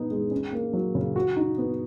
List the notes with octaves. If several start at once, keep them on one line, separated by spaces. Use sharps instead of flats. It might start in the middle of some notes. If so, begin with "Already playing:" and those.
Already playing: B3 D#4
G#3
C#4
A#3
F#3
C#3
F#4
D#4
B3